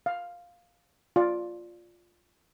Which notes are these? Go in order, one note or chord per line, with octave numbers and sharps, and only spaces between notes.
F5
F4 D5